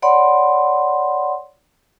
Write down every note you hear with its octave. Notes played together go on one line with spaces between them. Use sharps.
C#5 D5 F#5 B5 C6